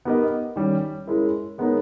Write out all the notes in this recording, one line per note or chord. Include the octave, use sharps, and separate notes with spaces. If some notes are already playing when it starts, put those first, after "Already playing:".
B3 D#4 G4 A#4 D#5
D#3 G3 C#4 G4
G#3 C#4 E4 A#4
G#3 B3 D#4 A#4 C#5